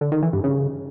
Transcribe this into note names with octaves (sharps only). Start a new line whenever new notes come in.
D3
D#3
E3
G2
C#3